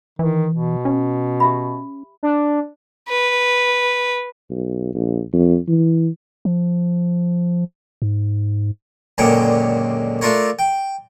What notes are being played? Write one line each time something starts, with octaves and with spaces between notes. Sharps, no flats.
D#3 E3
B2
C#4
G4 E5 B5
D4
B4
B1
A#1
F2
E3
F3
G#2
C#2 F#2 A#2 D3 C#5 G5
A3 D4 F4 A#4 C#5
G5